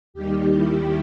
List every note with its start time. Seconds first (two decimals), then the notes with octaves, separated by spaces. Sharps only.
0.14 D#2 D#3 G3 G4
0.54 E4